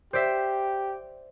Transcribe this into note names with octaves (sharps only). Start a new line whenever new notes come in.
G4 C5 D5 E5